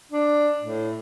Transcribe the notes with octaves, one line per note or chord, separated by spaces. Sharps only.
D4
A2